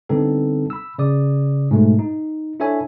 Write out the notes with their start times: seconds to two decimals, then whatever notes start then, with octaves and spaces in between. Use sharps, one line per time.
0.09 D3 G3 B3 C4 D#4 A4
0.70 B5 E6
0.98 C#3 D5 D#6
1.71 G#2 B2 A3
1.99 D#4
2.60 D4 E4 A4 C#5 E5 G#5